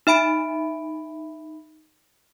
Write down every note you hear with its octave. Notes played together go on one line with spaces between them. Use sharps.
D#4 E5 B5 D7